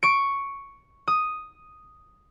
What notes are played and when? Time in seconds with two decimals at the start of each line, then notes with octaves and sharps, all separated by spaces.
0.03 C#6 D7
1.08 D#6